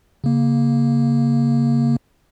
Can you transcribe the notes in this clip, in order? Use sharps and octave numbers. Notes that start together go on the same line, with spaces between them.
C#3 A#3